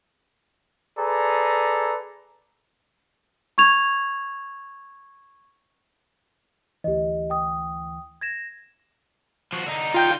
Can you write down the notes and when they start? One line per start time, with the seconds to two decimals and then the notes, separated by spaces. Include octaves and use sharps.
0.98 G#4 A4 B4 D5 A#5
3.58 C#6 G#6 F7
6.84 D2 E3 G4 D#5
7.30 G5 D#6
8.21 G#6 A#6 E7
9.53 F3 F#4
9.66 D3 D#4
9.94 F4 G5 G6